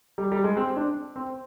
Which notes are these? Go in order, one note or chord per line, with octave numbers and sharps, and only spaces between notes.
G3
G3
G#3
C4
D4
C4